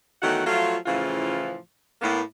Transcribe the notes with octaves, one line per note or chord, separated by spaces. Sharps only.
E2 D#3 F#3 A3 F#4 F#5
F3 F#3 A3 F4
A2 C#3 E3 F3 F4
A2 A#3 B3